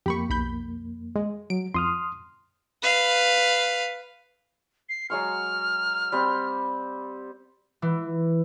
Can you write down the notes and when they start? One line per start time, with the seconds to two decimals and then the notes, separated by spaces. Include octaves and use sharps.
0.06 F2 A#3 G4 B5 C#6
0.30 B1 B5 G6
1.16 G#3
1.50 F#3 D7
1.74 F2 C6 D#6 F6
2.83 B4 F5
4.89 C7
5.10 F#3 G#3 C#6 F6
6.12 G3 C4
7.82 E3